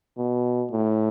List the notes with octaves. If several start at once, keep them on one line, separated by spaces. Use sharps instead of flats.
B2
A2